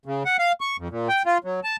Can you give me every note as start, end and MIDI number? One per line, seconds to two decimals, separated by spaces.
0.06 0.23 49
0.25 0.37 78
0.39 0.52 77
0.61 0.77 85
0.79 0.88 41
0.90 1.08 46
1.09 1.23 79
1.26 1.38 65
1.44 1.60 54
1.64 1.76 81